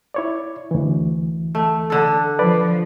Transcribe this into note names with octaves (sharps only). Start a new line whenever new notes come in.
E4 C#5 D5
D2 E3
A3
D3 A4
F3 B4 D5